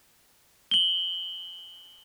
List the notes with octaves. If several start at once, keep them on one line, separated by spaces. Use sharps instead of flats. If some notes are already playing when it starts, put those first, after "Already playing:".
F#7 G7